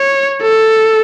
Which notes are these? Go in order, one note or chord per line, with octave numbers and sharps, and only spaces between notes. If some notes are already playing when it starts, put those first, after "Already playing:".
Already playing: C#5
A4